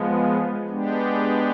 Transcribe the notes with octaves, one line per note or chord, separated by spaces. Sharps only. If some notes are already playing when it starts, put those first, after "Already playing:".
Already playing: F3 G#3 B3
G#3 B3 D4 G4